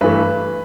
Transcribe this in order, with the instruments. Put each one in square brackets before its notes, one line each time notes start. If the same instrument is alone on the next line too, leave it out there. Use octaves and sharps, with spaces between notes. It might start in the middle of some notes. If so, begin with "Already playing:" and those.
[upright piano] G2 E3 A3 B4